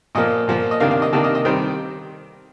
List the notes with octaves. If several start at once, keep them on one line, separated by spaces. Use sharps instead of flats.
A#2 F3 A#3 D#5
A#2 F3 A#3
D#5
C3 D#3 A#3 D4 F5
F5
D#5
C3 D#3 A#3 D4 A5
D#5
D#5
D#3 G3 C4 C5